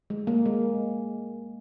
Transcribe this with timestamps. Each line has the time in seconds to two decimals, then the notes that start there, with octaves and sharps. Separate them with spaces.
0.10 G#3
0.27 A#3
0.46 G#3